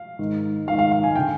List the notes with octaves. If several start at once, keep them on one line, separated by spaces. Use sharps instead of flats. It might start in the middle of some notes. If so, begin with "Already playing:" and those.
Already playing: F5
G#2 D#3
G#2 D#3 F5
F5
F5
G#5
D3 G5